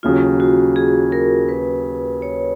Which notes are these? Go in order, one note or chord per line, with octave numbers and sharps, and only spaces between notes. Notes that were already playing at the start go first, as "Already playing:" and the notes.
D#2 C#3 F#3 F4
F#4
G#4
A#4
B4
C#5